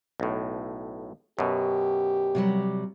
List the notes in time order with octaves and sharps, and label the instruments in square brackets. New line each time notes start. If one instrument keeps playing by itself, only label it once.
[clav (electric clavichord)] B1 A2
[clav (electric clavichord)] F#2 B2 [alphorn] G4
[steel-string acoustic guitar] C3 F#3 G3